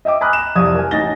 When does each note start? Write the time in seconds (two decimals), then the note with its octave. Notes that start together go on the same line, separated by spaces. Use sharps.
0.05 D#5 E5 G5 D6
0.21 G#5 A#5 B5 D#6 F6 F#6
0.33 E7
0.56 C2 F2 D#6 G#6
0.75 A#4 G#5
0.91 A1 D#4 G#5 A6 A#6 G7